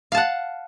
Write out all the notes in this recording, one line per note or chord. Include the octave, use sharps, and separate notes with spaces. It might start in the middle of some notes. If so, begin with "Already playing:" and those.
F5 F#5 A5